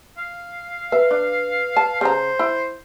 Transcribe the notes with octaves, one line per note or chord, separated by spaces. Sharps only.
F5
B4 E5
D4
A5
C#3 D4 C5 A#5
E4